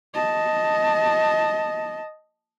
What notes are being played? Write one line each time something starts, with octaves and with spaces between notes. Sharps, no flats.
D#5 A5